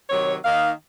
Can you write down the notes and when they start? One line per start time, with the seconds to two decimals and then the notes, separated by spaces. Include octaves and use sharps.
0.09 C3 D#3 F#3 C#5
0.44 D#3 A#3 D#4 F5